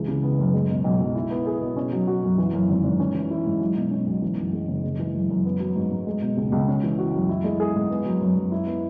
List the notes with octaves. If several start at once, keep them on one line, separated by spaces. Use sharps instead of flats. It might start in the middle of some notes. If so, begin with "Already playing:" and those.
Already playing: C#2 E3
C#3
B3
F#2
G#3
B2
B1
B1
E4
B3
G#4
B2
C#4
F#3
F#4
F#2
E3
F#2
G#1
G#1
C#4
E3
E4
G#2
F#3
B2
C#4
B1
E3
F#2
G#3
F#1
G#3
E3
F#2
F#2
B3
F#3
G#2
G#2
G#3
B2
C#2
C#2
C#4
E3
F#4
F#2
E4
G#3
G#4
G#2
B3
F#3
F#2
F#2
E4
B3